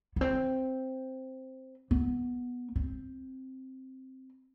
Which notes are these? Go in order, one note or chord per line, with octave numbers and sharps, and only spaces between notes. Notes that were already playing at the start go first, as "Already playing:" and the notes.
B3
C4
B3
C4